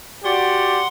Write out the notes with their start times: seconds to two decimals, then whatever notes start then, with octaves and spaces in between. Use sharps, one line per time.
0.24 F#4 G4 D5 F#5 C6